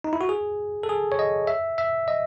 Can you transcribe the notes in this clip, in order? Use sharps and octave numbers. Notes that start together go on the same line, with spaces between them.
D#4
E4
F#4
G#4
A4
G#4
C#5
D#5
E5
E5
D#5